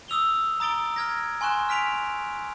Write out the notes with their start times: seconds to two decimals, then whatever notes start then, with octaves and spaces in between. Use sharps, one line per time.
0.08 D#6 E6 F7 G7
0.60 A#5 D#6 A6 D7 G7
0.96 F6 G#6 A#6
1.41 G#5 C6 C#6 F#6 E7
1.69 F6 B6 D7 F7